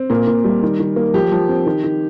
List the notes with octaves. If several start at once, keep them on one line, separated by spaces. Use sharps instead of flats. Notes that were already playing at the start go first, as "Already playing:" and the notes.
Already playing: C4
A#2 A#4
A#2
G3
D#3
D#3
A#3
F3 G4
F3
C4
D#3
D#3